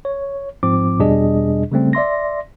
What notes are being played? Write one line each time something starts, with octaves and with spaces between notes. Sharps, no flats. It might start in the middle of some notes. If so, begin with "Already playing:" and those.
C#5
G#2 F3 C4 D6
E2 B2 G3 D4 G#4 D#5
C#3 G3 A3 C4
D5 E5 C6 A#6